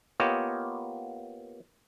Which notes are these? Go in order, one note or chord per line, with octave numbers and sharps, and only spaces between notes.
A#3 B3 F4 G4 C#5 D#5